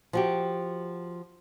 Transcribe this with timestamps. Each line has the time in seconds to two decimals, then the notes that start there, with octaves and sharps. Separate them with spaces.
0.13 F3 F#4 G4